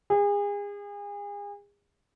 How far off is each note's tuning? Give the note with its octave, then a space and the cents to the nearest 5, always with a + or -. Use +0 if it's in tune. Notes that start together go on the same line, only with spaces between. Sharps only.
G#4 -35